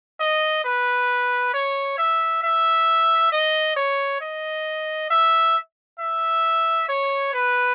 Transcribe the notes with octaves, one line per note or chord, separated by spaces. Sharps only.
D#5
B4
C#5
E5
E5
D#5
C#5
D#5
E5
E5
C#5
B4